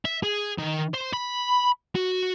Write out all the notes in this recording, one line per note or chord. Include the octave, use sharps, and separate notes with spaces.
E5
G#4
D#3
C5
B5
F#4